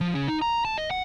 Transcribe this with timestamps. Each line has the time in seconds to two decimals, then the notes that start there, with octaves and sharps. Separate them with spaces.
0.01 F3
0.15 C#3
0.28 D#4
0.42 A#5
0.65 A5
0.78 D#5
0.91 F#5